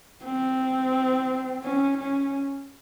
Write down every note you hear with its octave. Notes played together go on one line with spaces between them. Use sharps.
C4
C#4
C#4